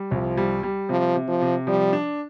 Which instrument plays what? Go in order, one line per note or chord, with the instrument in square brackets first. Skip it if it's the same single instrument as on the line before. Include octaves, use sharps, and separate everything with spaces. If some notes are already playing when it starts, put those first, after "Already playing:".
Already playing: [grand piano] G3
[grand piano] C2 [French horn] F3
[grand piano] G3
G3
[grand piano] C3 [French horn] F3
[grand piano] C3
[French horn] F3
[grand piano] C3
[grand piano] F3 [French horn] G3
[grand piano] D4